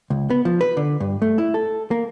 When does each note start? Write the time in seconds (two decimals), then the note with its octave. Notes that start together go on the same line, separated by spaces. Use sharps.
0.10 C#2
0.30 B3
0.45 F3
0.61 B4
0.77 D3
1.00 G2
1.22 A3
1.38 E4
1.54 A4
1.91 A#3